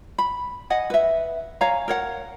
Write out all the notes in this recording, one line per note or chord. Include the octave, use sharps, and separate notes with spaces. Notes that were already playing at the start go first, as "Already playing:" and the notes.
B5
D#5 F#5 G#5
B4 E5
C#5 F5 G#5 A#5
A#4 C#5 F#5